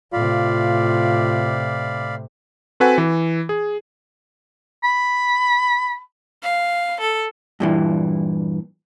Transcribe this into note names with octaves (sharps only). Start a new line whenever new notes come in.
A2 C3 F4 D5 F5 B5
C4 F#4 A4 B4 F#5 G#5
E3
G#4
B5
F5
A4
G2 A#2 E3